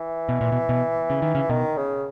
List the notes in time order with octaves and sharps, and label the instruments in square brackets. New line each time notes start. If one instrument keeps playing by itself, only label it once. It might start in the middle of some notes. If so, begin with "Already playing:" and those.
Already playing: [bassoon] E3
[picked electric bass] B2
A#2
B2
B2
C#3
D#3
C#3
[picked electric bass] B2 [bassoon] D#3
[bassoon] C#3